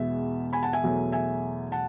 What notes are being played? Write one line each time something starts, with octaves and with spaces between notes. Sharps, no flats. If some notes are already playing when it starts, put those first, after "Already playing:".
Already playing: E2 B2 G#3 B3 E5
G#5 B5
F#5 A5
E5 G#5
E2 B2 F#3 A3
E5 G#5
F#5 A5